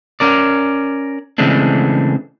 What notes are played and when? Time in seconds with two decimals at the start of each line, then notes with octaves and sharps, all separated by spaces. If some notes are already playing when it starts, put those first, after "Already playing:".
0.20 C#4 A#4 D5
1.38 C#3 E3 G#3 A3 C4 D4